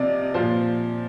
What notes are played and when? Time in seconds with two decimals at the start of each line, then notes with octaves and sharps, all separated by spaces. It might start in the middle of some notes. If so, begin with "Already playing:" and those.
Already playing: C3 F3 D5 D#5
0.34 A#2 F3 C5